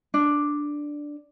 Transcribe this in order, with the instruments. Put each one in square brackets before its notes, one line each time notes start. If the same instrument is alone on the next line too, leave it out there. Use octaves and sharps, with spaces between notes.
[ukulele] D4